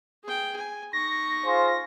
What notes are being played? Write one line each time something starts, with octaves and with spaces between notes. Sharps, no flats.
G#4 G5
G#5
D#4 C#6 A#6
F4 G#4 C5